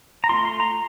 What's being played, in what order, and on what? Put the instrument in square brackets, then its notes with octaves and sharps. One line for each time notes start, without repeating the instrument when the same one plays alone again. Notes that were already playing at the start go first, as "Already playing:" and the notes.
[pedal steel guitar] A#5
A3 C4 F4 C6
C6
A#5